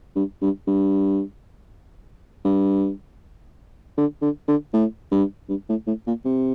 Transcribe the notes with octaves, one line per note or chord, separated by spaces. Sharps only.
G2
G2
G2
G2
D3
D3
D3
A2
G2
G2
A2
A2
A#2
C3